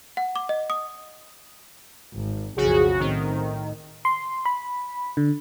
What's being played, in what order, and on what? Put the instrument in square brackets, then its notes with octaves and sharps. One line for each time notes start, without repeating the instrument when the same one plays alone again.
[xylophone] F#5
D6
D#5
D#6
[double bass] G#1
[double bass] B1 F2 [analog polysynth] C#3 F#4 [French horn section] G#4
[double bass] A2 [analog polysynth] D#3 [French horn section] C4
[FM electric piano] C6
B5
D3